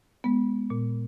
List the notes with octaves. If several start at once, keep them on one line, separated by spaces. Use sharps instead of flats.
G#3 B3
A#2